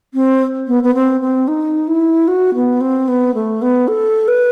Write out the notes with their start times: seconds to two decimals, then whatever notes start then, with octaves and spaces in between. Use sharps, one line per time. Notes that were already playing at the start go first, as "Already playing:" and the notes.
0.14 C4
0.67 B3
0.83 B3
0.95 C4
1.21 C4
1.48 D#4
1.88 E4
2.28 F#4
2.55 B3
2.81 C4
3.08 B3
3.34 A3
3.62 B3
3.88 A4
4.28 B4